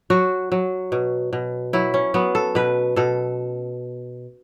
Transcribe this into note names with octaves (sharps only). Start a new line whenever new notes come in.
F#3 F#4
F#3
B2
B2
F#3 E4
C#4
F#3 B3
A4
B2 B4
B2 A4